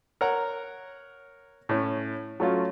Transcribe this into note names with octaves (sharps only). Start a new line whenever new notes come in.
A#4 C#5 F#5 A#5
A2 C#4
F#3 A3 C#4 F4